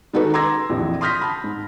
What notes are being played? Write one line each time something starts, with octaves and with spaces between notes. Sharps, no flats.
D#3 G#3 D#4 F#4 A4 B4
A#5 C6 D6 E6 G#6 A#6
A#1 F2 E3
C6 D#6 F6 G6 A#6 B6
A5 B5
G#2